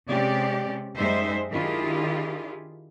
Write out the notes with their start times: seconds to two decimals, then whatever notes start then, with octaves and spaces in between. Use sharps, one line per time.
0.10 C3 G#3 C4 C#4 G4 D5
0.97 F#2 G3 G#3 D#4 C5 E5
1.51 D#3 D4 E4 F4 G4 G#4